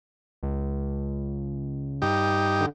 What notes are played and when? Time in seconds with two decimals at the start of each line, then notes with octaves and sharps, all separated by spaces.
0.43 C#2
2.02 G2 D#4 G4
2.60 D3